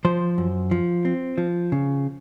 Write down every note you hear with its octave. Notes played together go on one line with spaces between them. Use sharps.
F3 C5
F#2
F3
C4
F3
C#3